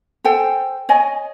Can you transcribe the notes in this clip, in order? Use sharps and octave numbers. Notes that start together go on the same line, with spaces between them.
A4 C5 G5 G#5
C#5 D#5 G#5